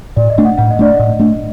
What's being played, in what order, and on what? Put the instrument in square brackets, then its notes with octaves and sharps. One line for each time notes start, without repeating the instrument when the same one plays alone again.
[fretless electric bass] A2 [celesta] D5
[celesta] D#5
[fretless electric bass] A3 D4
[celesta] F#5
[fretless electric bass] A2 [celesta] F#5
[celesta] D#5
[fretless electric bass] A3 D4 [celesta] D5
[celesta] D#5
[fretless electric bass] A2
A3 D4